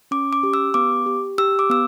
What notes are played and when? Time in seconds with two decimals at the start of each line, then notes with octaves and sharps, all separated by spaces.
0.11 C#4 D6
0.33 D6
0.43 G4
0.54 E6
0.74 B3 D6
1.06 G4
1.38 G4 E6
1.59 D6
1.70 B3 E6